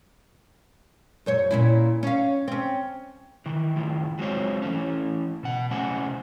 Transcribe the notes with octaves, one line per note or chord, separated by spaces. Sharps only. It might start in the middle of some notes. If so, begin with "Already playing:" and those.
F#2 C5 C#5
A#2 C#4 E4
C#4 F5
C4 C#4
D#3 E3
A2 D#3 F4
F#3 G#3 C4 F4 C5 C#5
E3 A3 C#4
B2 F#5
C3 A3 C#4 C5 F#5 G#5